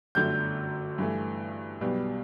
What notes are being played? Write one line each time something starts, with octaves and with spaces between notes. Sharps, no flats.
G1 F#2 D3 A3 G6
G2 E3 A3
B1 B2 G3 B3